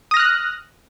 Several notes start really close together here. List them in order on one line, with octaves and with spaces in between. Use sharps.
D#6 A#6 F6 F#6